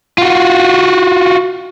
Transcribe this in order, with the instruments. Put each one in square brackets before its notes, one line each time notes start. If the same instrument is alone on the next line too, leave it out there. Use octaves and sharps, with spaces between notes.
[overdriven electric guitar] F4 F#4